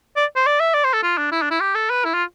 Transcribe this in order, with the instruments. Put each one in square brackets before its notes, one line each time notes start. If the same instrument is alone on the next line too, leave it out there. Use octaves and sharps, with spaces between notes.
[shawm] D5
C5
D5
E5
D5
C5
A4
F4
D4
E4
D4
E4
G4
A4
B4
E4
F4